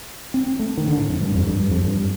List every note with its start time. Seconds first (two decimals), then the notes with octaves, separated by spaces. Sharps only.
0.34 C4
0.47 C4
0.59 A3
0.77 D#3
0.88 D3
0.97 A2
1.09 F2
1.21 G2
1.35 F2
1.47 G2
1.59 G2
1.71 F2
1.84 G2